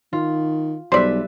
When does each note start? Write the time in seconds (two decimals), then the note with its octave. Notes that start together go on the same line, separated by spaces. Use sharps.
0.13 D#3 F4
0.92 B1 G3 B4 C5 D5 E5